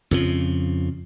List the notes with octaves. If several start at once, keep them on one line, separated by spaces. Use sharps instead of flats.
F2 C#3 F3